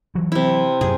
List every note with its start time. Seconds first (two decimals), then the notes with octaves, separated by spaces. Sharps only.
0.15 E3 F#3
0.32 C3 E4
0.81 F#2 C3 G#4